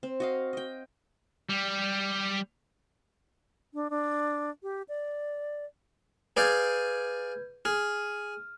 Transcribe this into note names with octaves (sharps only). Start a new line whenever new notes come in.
C4
F#4 D#5 F5
D#5 G5
G3
D4
D4
G4
D5
G#4 B4 D5 F5 G6 G#6
G#4 F6